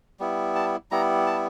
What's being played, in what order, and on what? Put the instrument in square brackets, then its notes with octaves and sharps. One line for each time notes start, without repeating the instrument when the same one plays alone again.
[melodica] G3 B3 E4
A5
G3 B3 E4 A#5
A5